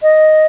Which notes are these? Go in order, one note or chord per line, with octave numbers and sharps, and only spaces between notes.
D#5